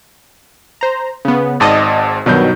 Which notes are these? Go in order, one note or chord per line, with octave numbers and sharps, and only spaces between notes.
C5 A#5
C#3 B3
G#1 G#2 D5 D#5 A5
G2 B2 D#3 F#3 G6